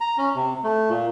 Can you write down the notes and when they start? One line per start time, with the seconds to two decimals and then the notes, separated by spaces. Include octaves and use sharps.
0.01 A#5
0.18 C#4
0.35 C3
0.64 A3
0.90 A#2